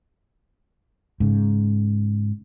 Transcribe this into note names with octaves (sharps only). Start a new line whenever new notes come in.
G#2 C#3